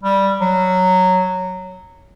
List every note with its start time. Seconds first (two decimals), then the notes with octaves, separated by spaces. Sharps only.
0.03 G3
0.41 F#3